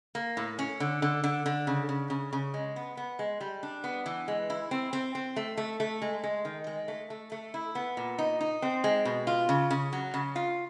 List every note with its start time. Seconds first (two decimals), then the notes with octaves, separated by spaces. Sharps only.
0.15 A#3
0.37 A2
0.59 C#4
0.80 D3
1.02 D3
1.24 D3
1.46 D3
1.67 C#3
1.89 C#3
2.10 C#3
2.33 C#3
2.54 G#3
2.76 B3
2.97 B3
3.19 G#3
3.40 G3
3.63 D4
3.84 B3
4.06 E3
4.28 G#3
4.50 E4
4.71 C4
4.93 C4
5.15 C4
5.36 A3
5.57 A3
5.80 A3
6.02 G#3
6.24 G#3
6.45 D#3
6.67 G#3
6.88 A3
7.10 A3
7.32 A3
7.54 E4
7.75 B3
7.97 A#2
8.18 D#4
8.40 D#4
8.62 C4
8.84 G#3
9.05 B2
9.27 F4
9.49 C#3
9.70 C#3
9.93 F#3
10.14 C#3
10.36 F4